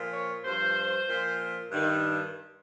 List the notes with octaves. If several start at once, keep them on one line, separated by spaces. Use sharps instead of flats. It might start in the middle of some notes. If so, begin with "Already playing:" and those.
Already playing: A#2 F3
C#5
G2 F3 C5
A#2 F3
G2 D#3